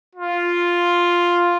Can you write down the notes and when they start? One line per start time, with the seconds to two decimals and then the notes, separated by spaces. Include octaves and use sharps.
0.15 F4